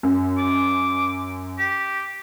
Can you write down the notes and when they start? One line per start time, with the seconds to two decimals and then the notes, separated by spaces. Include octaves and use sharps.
0.03 F#2
0.38 D6
1.59 G4